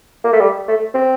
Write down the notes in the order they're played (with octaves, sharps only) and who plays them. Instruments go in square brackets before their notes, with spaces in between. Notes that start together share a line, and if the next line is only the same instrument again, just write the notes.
[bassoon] A#3
A3
G3
A3
C4